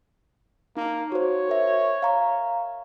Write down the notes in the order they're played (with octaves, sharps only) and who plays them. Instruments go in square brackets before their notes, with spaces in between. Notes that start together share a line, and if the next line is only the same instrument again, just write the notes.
[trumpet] A#3 [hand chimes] D#4
[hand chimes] F#4 C5 [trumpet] C#5
[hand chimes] A#4 E5
F5 A#5 C#6